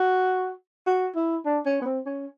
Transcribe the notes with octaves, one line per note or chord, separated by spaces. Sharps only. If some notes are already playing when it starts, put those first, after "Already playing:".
Already playing: F#4
F#4
E4
D4
C#4
B3
C4
C#4